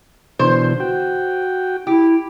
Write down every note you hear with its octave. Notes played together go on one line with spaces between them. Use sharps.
B2 D3 E3 C5
F#4 G5
E4 G4